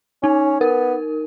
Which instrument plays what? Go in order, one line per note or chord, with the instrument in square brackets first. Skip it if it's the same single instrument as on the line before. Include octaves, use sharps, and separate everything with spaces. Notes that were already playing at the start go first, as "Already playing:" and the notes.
[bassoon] C#4 [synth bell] D#4
[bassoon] B3 [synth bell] A#4